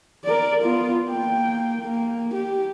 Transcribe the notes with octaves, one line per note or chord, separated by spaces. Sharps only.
A#4 D5
B3 F4
A#3 G5
A#3
G4